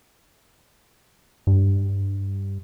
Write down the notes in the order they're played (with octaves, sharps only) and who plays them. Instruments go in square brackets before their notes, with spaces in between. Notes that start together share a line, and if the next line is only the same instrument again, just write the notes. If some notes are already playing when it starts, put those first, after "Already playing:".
[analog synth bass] G2